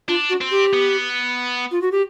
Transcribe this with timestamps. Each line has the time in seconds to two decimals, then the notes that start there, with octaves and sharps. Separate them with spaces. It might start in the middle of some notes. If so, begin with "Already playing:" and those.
0.08 D4 F4
0.30 F#4
0.41 C4
0.51 G4
0.73 B3
1.71 F4
1.82 F#4
1.92 G4